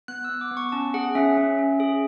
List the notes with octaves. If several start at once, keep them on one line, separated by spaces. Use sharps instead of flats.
B3 F#6
B3 E6
D6
B3
C#6
C#4 A5
G#4 F#5
C#4 E5
C#4
C#4
G#4